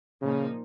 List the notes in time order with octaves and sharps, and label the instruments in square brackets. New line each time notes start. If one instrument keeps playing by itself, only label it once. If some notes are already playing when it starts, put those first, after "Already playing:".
[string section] A#2 F3 A#3 D#4 [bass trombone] C#3